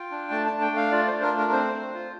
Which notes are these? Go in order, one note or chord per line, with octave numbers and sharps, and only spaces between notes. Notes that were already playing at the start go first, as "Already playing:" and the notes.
Already playing: F4 G5
D4
A3 A5
D4 A5
G5
A3
F5
F4 D5
D4 C5
A#4
A3
A#4
C4 C5
C4
F4